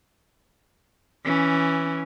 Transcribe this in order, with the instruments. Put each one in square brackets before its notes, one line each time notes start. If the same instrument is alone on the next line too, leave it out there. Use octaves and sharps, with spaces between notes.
[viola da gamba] E3 C#4